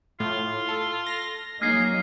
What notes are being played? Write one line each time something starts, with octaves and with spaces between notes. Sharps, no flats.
A2 F4
A4
A#6
F#3 A#3 D#4 G#4 F6 C7